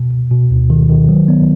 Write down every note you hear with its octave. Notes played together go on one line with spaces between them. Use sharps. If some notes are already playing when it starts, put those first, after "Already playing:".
Already playing: B2
B2
B2
D2
D#3
D#3
F#3
B3